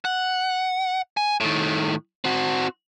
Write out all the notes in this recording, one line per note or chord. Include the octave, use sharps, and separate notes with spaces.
F#5
G#5
A2 D#3
C4 F#4